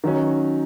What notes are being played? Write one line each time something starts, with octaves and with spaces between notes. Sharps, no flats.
D#3 F#3 C#4